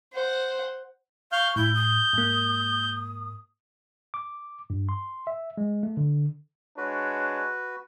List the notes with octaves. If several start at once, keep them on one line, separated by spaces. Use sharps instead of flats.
C5 F#5
F5 C#6 F6 G6
A2 E4 G6
D#6
G#2 A#3
D6
G2
C6
E5
G#3
A3
D3
G#3 D4 F#4 B4 C#5